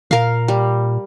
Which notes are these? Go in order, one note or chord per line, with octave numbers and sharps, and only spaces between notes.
A#2 A#4 F5
G3